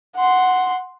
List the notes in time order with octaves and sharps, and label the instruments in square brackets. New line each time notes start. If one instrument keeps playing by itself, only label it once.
[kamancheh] F#5 C6